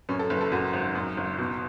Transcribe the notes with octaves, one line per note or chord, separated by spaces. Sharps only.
F#2 C#4
A4
F#1 B4
A4
F#2 F#4
G#1
F#2
F#1
B2